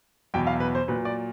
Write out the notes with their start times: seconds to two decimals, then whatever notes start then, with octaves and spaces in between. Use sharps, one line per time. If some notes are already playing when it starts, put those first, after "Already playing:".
0.34 E2 B2 F#3 G5
0.47 F5
0.60 B4
0.75 C5
0.88 A#2 F#3 B4
1.05 D5